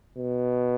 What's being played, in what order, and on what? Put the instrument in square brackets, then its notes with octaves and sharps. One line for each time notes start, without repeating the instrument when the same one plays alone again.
[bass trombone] B2